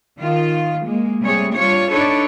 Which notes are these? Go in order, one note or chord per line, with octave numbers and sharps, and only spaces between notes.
D#3 F4
G#3 A#3
C3 G3 A3 G#4 C#5
G3 D4 F4 C#5
D4 D#4 A4 B4 C#5 D5